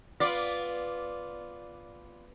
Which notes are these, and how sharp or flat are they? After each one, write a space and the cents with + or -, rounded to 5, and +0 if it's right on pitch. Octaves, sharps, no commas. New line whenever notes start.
B3 +0 F4 +0 D5 -10